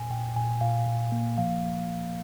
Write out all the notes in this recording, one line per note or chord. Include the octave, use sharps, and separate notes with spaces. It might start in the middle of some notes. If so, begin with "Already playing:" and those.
Already playing: A#2 G#5
A#2 G5
A#2 G#5
A#2 F5
A#2
A#3
F3 F5